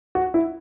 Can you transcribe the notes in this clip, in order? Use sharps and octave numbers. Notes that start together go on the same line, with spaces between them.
F#4
E4